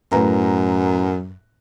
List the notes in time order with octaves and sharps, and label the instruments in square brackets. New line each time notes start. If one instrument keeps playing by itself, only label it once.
[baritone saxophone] F#2 [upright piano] A2 B4 A#5